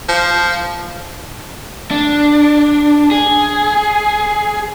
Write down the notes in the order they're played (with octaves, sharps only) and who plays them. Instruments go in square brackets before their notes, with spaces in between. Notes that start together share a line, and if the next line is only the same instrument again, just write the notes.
[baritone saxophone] F3
[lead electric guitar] D4
G#4